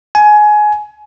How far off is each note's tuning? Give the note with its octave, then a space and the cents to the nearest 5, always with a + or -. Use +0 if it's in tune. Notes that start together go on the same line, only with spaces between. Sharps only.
G#5 +20